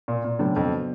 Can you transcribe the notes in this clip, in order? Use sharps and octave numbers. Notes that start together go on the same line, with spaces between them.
A#2
A#2
A2 C#3 F#3 B3 D4
F2